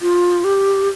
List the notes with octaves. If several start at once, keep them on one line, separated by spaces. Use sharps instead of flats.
F4
G4